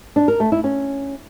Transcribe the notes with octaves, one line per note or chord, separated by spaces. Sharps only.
D4
A#4
A3
E4
C#4